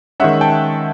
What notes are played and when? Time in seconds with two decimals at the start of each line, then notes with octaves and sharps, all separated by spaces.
0.20 D#3 G#3 C#4 E5 F#5
0.41 G5 A5